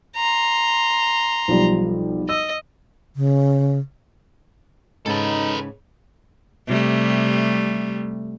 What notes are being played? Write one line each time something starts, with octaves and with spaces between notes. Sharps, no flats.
A#5 C6
B1 F3 G3
D#5 E6
C#3
G#2 C#3 D#4 A4 B4 A5
C3 G3 A3